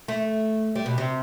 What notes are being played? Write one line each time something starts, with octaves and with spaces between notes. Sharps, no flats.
A3
G3
B2
C3